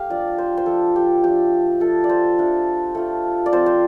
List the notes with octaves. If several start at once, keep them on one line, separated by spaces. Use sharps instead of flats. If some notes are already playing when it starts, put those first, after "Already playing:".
Already playing: A3 G4 F5
F3 D4 F4 D5
C5
C5
F3 A3 D4 A4
G4
F3 A3 D4 G4
F3 A3 F4 A4
D5
C5
F3 A3 D4 F4
A3 F4
D5
F3 C4 F4 C5
C5